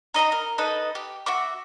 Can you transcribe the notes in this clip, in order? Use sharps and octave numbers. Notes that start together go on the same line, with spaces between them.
D#4 D#5 E5 A#5
A#4
D#4 A4 B4 D#5
G4
F#4 E5 D6